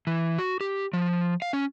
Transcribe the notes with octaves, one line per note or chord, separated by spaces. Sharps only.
E3
F#4
G4
F3
F5
C#4